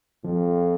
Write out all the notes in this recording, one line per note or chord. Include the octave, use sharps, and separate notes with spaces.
F2 F3